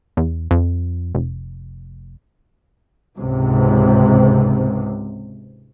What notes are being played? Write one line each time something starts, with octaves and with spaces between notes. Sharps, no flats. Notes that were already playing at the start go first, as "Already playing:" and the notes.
E2
F2
F1
C#2 G#2 C3